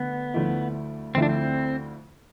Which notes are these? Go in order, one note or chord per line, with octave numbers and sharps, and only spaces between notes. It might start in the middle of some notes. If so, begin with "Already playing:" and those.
Already playing: D3 A3 B3
D2 D3 F3 A3 E4
D2 D3 F3 A3 C4 E4
D4
C4